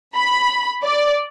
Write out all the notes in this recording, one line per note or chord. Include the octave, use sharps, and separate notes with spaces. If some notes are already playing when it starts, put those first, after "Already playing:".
B5
D5